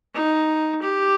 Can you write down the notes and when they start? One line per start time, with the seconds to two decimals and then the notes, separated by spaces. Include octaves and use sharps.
0.15 D#4
0.81 G4